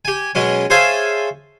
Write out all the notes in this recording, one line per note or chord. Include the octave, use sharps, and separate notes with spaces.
G4 G#5
B2 F#3 G#3 C#4
G#4 C5 C#5 E5 F5 A5